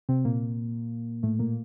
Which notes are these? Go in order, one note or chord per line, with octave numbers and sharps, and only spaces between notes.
C3 C4
A#2 A#3
A2 A3
A#2 A#3